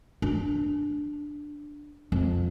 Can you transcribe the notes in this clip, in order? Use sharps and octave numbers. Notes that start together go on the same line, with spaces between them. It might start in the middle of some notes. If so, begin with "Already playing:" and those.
D4
F2